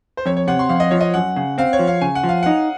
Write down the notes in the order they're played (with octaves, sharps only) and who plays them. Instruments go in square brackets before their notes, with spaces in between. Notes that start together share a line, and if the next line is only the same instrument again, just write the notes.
[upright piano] C5
[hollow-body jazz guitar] F2 [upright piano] C#5
[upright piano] C#5
[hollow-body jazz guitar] C3 [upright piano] F#5
[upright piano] C6
[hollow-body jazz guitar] F2 [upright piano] F5
[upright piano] D#5
[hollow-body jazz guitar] F3 [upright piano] C#5
[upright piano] D#5
[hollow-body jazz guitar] F#2 [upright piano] F#5
[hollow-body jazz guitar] C#3
[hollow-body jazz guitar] C4 [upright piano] F5
[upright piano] C#5
[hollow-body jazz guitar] F3
[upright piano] F5
[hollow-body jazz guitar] C#3 [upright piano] G#5
[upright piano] F#5
[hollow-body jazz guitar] F3
[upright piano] F5
[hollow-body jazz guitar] D#4 [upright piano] F#5